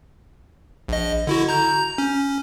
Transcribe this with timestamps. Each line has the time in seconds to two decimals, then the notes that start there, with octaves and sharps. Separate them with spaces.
0.88 A#1 D#5
1.27 D3 E4 F#4
1.48 A#5 G6
1.98 C#4